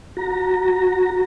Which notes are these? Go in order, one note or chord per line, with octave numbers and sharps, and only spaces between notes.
F#4 A#5